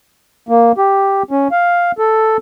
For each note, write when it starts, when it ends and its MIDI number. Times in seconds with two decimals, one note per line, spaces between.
0.49 0.72 58
0.78 1.23 67
1.31 1.48 61
1.51 1.92 77
1.98 2.37 69